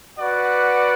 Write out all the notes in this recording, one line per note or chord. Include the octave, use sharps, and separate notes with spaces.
F#4 B4 D5 F#5